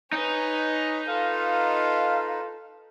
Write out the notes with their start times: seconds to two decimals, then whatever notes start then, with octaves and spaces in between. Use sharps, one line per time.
0.12 D#4 B4 C#5 G#5
1.08 F4 A4 B4 F5